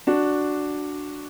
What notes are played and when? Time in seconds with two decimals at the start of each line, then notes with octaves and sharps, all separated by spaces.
0.07 D4 F#4